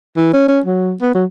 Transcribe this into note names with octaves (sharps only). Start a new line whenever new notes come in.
E3
C#4
C#4
F#3
B3
F#3